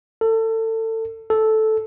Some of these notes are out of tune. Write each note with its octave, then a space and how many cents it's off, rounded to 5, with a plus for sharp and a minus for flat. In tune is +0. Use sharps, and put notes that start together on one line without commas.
A4 +30
A4 -5